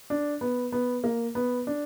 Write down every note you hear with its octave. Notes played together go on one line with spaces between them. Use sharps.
D4
B3
B3
A#3
B3
D4